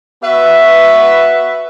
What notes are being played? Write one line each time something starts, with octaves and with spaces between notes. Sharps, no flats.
B3 F#4 B4 E5